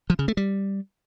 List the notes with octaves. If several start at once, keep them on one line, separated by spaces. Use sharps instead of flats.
F3
C#3
A3
G3